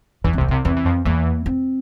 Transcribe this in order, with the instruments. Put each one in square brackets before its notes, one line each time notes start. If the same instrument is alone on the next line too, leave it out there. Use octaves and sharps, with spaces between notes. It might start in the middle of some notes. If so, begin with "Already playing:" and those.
[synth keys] E2 E3 [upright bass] C#4
[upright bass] C4
[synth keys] C2 C3
[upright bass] A#3
[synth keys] C2 C3 [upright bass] C4
[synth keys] E2 E3 [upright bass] C4
[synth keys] E3
F2 F3
[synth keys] E2 E3 [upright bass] A#3
[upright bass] C4